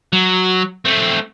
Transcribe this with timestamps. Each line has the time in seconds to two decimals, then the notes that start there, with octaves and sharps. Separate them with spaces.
0.13 F#3
0.85 A3 C4